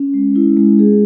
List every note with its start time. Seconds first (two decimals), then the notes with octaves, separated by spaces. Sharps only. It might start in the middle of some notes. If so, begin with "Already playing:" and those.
Already playing: C#4
0.14 G#3
0.36 E4
0.57 G#3
0.79 G#4